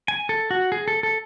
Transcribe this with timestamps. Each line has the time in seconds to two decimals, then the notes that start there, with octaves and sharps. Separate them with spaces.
0.08 G#5
0.29 A4
0.51 F#4
0.72 G#4
0.88 A4
1.03 A4